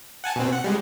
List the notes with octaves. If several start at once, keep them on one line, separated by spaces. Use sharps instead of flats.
F#5 G#5 A5
B2 C4
F#5
G3 G#3